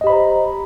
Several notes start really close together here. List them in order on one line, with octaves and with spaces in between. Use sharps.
D#5 G4 B5 C5 A#5